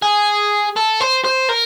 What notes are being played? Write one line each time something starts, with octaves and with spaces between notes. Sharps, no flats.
G#4
A4
C5
C5
A#4